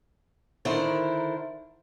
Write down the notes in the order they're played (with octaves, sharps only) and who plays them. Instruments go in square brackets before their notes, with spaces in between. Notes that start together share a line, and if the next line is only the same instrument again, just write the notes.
[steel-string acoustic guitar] D3 D#3 E4 A#4 C5